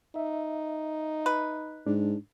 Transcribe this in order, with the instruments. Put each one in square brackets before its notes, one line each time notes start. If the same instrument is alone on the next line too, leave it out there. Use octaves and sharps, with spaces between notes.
[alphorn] D#4 [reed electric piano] E5
[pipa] B4
[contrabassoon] G#2 [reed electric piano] D4